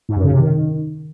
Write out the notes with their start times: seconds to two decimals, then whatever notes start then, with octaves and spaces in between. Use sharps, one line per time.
0.09 G#2
0.16 F#2
0.24 C#3
0.31 C3
0.39 D#3